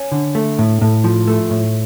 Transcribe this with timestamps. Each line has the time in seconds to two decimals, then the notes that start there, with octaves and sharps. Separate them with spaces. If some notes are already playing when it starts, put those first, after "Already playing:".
Already playing: C#4
0.12 D3
0.35 A3
0.59 A2
0.81 A2
1.04 F3
1.27 A3
1.50 A2